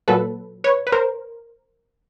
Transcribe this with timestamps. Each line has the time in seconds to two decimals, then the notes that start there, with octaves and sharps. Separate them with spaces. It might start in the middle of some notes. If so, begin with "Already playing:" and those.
0.08 A#2 F#3 A4 B4
0.64 B4 C#5
0.87 B4
0.92 A#4 C5